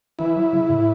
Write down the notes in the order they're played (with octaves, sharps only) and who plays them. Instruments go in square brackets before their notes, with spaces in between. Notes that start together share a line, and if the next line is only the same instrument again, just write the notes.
[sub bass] E3 [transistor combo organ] E4
[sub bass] F#3
C#3
A2